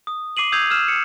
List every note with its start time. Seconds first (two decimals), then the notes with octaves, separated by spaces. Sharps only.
0.07 D#6
0.37 D6 C7 D#7 F#7
0.52 D#6 E6 G6 G#6 C7 F7
0.70 E6 F6 E7
0.88 C#7